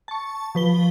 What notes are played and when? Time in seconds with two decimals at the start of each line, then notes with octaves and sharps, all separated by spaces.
0.08 A5 C#6
0.55 F3 B4 G7